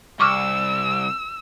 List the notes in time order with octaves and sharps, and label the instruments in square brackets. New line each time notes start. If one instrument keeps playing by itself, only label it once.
[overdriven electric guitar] C2 [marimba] C#6 D6 F6 [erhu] E6